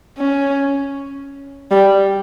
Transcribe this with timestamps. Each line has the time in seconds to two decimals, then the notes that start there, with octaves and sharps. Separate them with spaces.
0.18 C#4
1.71 G3